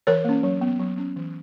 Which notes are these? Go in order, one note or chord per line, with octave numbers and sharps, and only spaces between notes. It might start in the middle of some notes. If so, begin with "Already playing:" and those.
E3 A#4 C#5
A#3 C#4
F#3
B3
F#3
C#4
E3